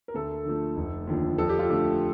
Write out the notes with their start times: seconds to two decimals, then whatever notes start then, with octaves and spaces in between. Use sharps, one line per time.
0.08 A#4
0.14 D2 A4
0.45 D3 F3 A3
0.77 F1
1.07 D#2 D3 F3
1.38 F2 A4
1.49 G4
1.59 F4
1.69 D3 A3 G4